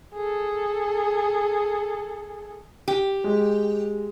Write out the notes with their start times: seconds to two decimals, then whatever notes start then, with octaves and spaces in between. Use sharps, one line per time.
0.15 G#4 A4
2.88 G4
3.24 G#3